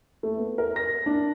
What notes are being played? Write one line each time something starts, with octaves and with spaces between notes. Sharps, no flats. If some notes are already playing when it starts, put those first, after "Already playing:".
A3
B3
A#4
A#6
D4